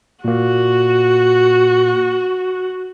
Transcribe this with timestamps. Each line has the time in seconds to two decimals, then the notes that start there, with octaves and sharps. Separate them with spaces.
0.25 A#2 A#3 F#4